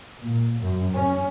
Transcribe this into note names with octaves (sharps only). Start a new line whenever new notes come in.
A#2
F#2
C#4